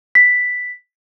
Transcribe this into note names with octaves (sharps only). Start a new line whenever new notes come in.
B6